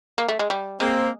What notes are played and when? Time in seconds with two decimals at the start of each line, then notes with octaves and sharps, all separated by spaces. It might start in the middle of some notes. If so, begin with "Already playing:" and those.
0.18 A#3
0.28 A3
0.39 G#3
0.50 G3
0.80 G#3 A#3 C4